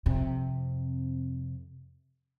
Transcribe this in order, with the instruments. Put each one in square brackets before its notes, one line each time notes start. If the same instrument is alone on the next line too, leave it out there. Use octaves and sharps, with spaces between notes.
[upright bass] F2 C3